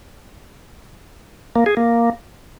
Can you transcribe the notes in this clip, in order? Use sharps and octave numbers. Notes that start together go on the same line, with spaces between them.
A#3
G#4
A#3